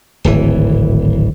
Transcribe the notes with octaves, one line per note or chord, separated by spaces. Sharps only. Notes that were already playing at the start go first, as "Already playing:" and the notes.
D1 G#1 E3